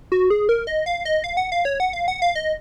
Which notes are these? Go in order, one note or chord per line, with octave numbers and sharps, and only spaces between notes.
F#4
G#4
A#4
D#5
F5
D#5
F5
F#5
F5
C#5
F#5
F5
F#5
F5
D#5